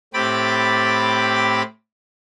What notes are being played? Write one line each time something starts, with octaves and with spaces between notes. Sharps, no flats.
A2 C4 G4 B5 D6 A6